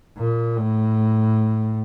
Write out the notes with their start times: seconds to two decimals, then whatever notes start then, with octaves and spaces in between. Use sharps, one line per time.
0.18 A#2
0.56 A2